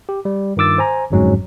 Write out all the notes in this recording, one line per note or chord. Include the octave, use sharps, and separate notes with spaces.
G4
G3
G2 D#3 F4 D6 E6 A6
C5 G#5 A#5
G1 F2 G#2 F#3 G#3 C#4